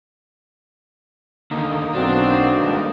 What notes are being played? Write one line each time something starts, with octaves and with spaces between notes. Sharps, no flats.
D#2 D3 A#3 D#4
B1 C4 D4 F#4
G#1 D2 G2